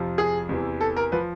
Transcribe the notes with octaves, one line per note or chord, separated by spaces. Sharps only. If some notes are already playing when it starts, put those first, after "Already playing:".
Already playing: F2 C3 F3
G#4
E2 C3 E3
A4
A#4
F3 B4